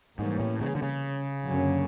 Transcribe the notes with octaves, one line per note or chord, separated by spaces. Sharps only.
G#2 C3 E3 G3 A#3 C#4
A2
C#3
D3
C#3
F#2 D3 F#3 A#3 C#4